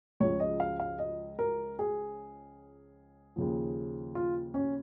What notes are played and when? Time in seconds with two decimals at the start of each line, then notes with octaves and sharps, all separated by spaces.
0.20 C#2 C#3 F3 C#5
0.40 D#5
0.60 F5
0.80 F5
0.99 D#5
1.39 A#4
1.79 G#4
3.36 D#2 C#3 F3
4.15 F4
4.54 C#4